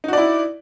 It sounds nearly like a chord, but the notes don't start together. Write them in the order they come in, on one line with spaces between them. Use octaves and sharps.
D#4 F#4 D5 E4